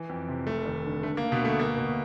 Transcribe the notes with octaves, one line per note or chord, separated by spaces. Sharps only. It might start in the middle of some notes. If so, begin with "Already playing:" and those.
Already playing: E3
F2
C3
F1 A3
D#2
D3
D3 A3
A#3
D3
B2 B3
D2 A3
B2 A#3
B2